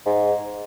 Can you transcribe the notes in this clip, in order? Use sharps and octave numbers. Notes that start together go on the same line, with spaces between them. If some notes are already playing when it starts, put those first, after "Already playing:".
G#2